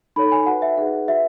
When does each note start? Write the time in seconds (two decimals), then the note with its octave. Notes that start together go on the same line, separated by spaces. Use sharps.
0.16 D#4 A4 C#5 B5
0.32 G#5
0.46 F#4 B4 F#5
0.62 E5
0.77 D#4 G#4 B4 F#5
1.08 F#4 B4 E5